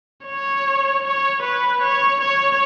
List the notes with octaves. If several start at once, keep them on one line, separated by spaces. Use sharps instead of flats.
C#5
C#5
B4
C#5
C#5